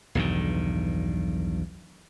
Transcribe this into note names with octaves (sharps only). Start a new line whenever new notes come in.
B1 E2 G2 D#3